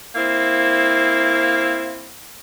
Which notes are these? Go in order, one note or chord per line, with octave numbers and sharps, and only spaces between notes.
A#3 C4 E4